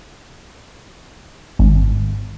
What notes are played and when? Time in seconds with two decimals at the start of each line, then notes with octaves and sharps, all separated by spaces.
1.59 G#1